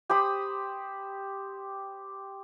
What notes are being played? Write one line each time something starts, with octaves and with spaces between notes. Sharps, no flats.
G4 C5 B5 D#6